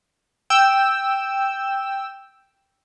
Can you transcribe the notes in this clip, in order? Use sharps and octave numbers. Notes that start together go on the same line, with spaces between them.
G5 E6